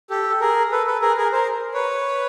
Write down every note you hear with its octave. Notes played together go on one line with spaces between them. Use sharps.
G4 A4
A4
G#4 A#4
A4 B4
A4 B4
G#4 A#4
G#4 A#4
A#4 C5
B4 C#5